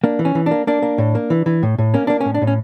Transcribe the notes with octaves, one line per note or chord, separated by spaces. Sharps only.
A#3 D4
E3
C#4
E3
A#3 D4
A#3 D4
A#3
A2
A#3
E3
E3
A2
A2
A#3 C#4
A#3 D4
C#4
A2
D4
A2
C#4